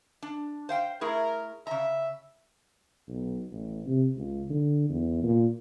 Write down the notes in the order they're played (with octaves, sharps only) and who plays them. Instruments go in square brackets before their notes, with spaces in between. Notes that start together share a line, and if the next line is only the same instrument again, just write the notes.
[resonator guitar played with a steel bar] D4
C5 F5 G5
[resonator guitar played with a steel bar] A3 E4 G#4 [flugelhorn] A#4
[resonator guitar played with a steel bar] C#3 A#5 [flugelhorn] E5
[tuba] B1
A1
C3
C#2
D3
E2
A#2